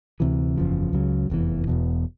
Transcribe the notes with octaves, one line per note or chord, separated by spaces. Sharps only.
D2 C3 E3
F#1 E2 C#3 F3
C#2 C#3 F#3
F1 E2 C3 E3
E1 E2 B2